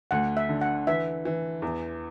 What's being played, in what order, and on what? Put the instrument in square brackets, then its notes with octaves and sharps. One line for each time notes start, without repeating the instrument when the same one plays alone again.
[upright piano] D2 [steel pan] F#5
[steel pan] E5
[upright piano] D3
[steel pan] F#5
[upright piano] E3 [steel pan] E5
[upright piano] E3
E2